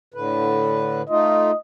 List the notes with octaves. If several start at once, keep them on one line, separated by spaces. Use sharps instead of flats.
A2 D3 B4
A3 D#4 F4 D#5